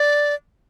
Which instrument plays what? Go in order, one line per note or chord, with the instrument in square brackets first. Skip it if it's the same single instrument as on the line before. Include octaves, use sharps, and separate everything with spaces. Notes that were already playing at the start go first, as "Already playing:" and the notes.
Already playing: [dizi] D5